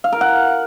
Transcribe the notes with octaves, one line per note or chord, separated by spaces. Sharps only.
F5
A#4
F#5